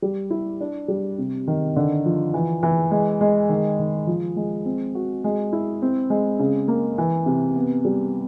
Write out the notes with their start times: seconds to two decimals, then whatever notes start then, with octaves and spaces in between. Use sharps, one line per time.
0.02 G3
0.30 E4
0.61 D4
0.88 G3
1.18 C3
1.47 D#3
1.76 D3
2.05 F3
2.34 E3
2.63 E3
2.91 G#3
3.21 G#3
3.49 D#3
3.79 D#3
4.07 F3
4.36 G#3
4.66 C4
4.95 F#4
5.24 G#3
5.53 E4
5.82 C4
6.10 G#3
6.39 C#3
6.68 A#3
6.98 E3
7.26 C3
7.56 B3
7.85 G3